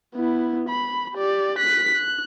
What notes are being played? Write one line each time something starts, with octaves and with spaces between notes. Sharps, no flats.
B3 E4
B5
G4 D5
F#6 B6
F#6